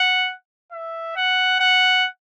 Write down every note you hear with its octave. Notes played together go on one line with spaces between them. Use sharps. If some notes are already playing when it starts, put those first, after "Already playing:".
Already playing: F#5
E5
F#5
F#5